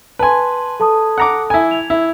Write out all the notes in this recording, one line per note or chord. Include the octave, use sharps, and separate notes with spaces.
B4 G#5 A5 C6
A4 A5 D#6
F#5 A#5 D6
E4 G#5
G#6 F7
E4